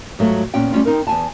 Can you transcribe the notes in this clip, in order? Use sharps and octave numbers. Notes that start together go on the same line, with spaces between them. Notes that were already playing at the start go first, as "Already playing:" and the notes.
G#2 F#3 A3 F4
A#2 B3 C#4 G5
G3 A3 C#4 F4
C4 D#4 A#4
E2 G#5 A5